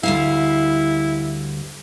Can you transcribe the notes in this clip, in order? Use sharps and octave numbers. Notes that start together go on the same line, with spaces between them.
D2 G3 E4 F5